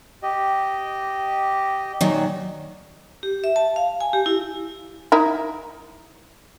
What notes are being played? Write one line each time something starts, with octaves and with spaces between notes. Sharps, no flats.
G4 D#5
A#2 D#3 F#3
G4
E5
A5
F5
G#5
G4
E4
D#4 E4 A#4